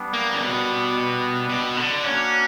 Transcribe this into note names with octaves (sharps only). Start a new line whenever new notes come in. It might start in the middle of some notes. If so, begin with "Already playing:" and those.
Already playing: G3 B3 D4
A#3
C#3
B2
B2
D3
A#3 C#4 D4 F#4